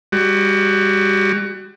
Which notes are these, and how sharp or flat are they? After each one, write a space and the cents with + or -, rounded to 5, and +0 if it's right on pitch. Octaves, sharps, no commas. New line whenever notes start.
G3 +35 F#4 +25